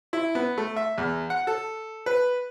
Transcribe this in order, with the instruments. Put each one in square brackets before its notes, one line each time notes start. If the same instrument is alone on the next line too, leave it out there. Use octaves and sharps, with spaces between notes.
[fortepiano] E4
B3
A3
E5
E2
F#5
A4
B4